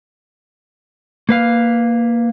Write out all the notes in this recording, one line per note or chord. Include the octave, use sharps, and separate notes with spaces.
A#3 B4 F5